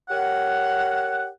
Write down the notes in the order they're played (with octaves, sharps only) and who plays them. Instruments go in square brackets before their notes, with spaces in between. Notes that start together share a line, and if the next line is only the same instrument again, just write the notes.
[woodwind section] G4 A#4 C#5 F#5